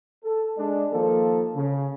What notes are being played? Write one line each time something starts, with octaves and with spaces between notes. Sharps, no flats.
A4
G#3 D4
D#3 F3 A#3 A4
C#3